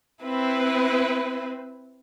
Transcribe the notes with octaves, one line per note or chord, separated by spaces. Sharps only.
C4 E4 B4